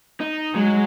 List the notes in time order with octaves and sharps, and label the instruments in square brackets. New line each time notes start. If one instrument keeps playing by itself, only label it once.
[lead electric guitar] D#4
[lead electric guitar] F#3 [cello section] G#3